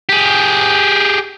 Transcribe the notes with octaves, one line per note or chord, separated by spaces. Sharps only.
G4 G#4